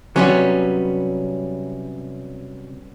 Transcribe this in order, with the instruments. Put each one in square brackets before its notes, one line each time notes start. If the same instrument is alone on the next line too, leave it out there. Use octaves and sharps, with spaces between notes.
[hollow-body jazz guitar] C3 F#3 [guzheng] G3 B3 C#4